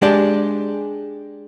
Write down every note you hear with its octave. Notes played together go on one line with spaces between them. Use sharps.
G#3 D4 G4 D5